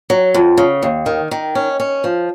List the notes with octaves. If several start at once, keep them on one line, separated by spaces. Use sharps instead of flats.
F#3
F2
C#3
D#2
D#3
D#3
C#4
C#4
F3